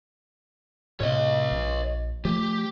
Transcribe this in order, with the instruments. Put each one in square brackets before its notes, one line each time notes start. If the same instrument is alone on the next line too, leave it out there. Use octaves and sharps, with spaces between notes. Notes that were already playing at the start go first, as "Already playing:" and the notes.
[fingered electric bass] A2 C3 [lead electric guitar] C#5 D#5
[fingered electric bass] A#1
[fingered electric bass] F3 A3 [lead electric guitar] G4